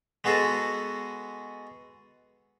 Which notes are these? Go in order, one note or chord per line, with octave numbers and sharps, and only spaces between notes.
G#3 B3 F#4 G#4 A4